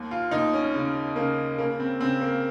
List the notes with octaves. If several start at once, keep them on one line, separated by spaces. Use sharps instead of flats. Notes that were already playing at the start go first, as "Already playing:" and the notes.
Already playing: D#2
F4
D#2 D#4
C#4
C#3
C#3 A#3
C#3 A#3
C4
C#3 C4
A#3